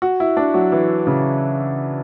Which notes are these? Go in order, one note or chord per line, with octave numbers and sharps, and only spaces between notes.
F#4
E4
D4
F#3
E3
C#3